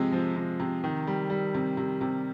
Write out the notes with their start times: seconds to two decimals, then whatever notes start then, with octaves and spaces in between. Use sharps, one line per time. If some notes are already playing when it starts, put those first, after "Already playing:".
Already playing: C3 F3 G#3
0.12 F3
0.36 C3
0.60 C3
0.84 D#3
1.07 G3
1.30 G3
1.54 C3
1.77 C3
2.01 C3